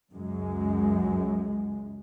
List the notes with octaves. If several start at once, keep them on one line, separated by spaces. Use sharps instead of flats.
C#2 F#2 G#3